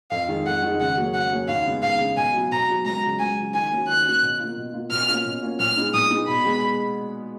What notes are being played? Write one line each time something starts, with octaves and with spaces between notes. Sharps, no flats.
F2 F5
D#3 G#3
F2 F#5
D#3 G#3
C#3 F#5
F#3 A#3 C#4
C#3 F#5
F#3 A#3 C#4
D#2 F5
C#3 G#3 B3
D#2 F5
C#3 G#3 B3
B2 G#5
F#3 B3 F#4
B2 A#5
F#3 B3 F#4
C#2 A#5
C#3 F#3
C#2 G#5
C#3 F#3
D#3 G#5
A#3 C#4 F#4
D#3 F#6
A#3 C#4 F#4
B2
A#3 F4
B2
A#3 F4
B2 F6
A#3 C#4 F4
B2
A#3 C#4 F4
A#2 F6
G#3 B3 D#4
A#2 D#6
G#3 B3 D#4
B2 B5
G#3 B3